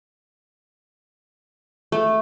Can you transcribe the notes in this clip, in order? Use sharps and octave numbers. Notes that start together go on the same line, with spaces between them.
A3